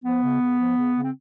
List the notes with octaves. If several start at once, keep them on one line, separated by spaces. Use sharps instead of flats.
F3 B3
C#3
C#3
F3
C#3
C#3
C4